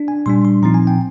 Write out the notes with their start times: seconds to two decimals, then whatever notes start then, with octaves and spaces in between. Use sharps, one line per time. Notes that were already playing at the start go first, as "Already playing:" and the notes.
Already playing: D4
0.08 G#5
0.26 A#2 G3 D4 C6
0.45 C6
0.63 A#2 F3 C4 D#4 A#5
0.74 G#5
0.87 G5